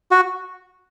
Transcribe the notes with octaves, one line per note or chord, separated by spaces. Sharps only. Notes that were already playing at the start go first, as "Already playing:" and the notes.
F#4